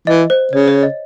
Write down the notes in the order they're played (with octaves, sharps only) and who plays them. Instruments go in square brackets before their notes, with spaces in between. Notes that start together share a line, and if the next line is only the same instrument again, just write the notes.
[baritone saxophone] E3 [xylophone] D#5
[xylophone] C5
[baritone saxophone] C#3 [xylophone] C#5
[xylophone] C#5
D#5